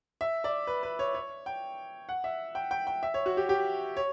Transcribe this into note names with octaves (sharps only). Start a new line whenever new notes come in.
E5
D5
B4
B4
C#5
C#5
G5
F#5
E5
G5
G5
G5
E5
C#5
F#4
G4
G4
C#5